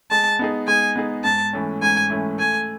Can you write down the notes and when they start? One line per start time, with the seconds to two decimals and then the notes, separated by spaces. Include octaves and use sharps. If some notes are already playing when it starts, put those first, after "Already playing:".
0.11 G#3 A5
0.39 B3 D#4 G#4
0.68 G#3 G#5
0.96 B3 D#4 G#4
1.24 G#2 A5
1.53 E3 A3 C#4
1.82 G#2 G#5
2.10 E3 A3 C#4
2.38 A3 G#5